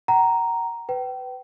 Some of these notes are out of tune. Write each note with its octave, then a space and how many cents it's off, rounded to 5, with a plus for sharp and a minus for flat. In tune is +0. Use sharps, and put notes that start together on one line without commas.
F#5 +40 A#5 +0
B4 +15 G5 -30